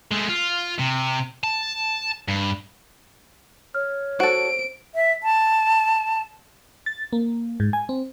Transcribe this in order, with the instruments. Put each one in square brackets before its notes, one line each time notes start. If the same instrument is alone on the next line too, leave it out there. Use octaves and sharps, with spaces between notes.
[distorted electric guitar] G#3 A3
F4
C3
A5
G2
[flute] C#5 [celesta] F6
[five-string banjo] F#4 A4 [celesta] C5 [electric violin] D7
[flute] E5
A5
[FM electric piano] A6
A#3
G#2
G#5
C4